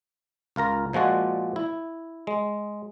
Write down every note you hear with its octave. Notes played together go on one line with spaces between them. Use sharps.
C#2 F4 A#4 A#5
A#2 F3 G#3 F#4 D5
E4
G#3